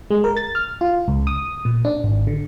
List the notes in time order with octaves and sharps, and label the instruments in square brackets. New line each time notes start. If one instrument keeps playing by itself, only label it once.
[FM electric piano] G#3
A#4
A6
F6
F4
C#2
D#6
A#2
D4
G#1
D3